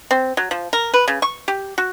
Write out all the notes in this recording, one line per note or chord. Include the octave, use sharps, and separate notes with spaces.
C4
F#3
F3
A#4
B4
C#3
C#6
G4
F#4